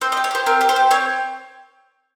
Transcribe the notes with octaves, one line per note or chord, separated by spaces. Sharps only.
C4 C5
D#5
G4
C#5
G4 C5
C4 A#4
G4
C5
G4
C4 C#5